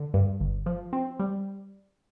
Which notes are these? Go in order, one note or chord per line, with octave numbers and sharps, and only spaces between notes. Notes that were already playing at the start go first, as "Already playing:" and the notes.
Already playing: D3
G2
G1
F3
C4
G3